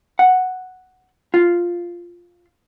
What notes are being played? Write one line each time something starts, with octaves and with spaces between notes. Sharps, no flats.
F#5
F4